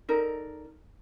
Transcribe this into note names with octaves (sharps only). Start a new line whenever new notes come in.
D#4 A4 A#4 D5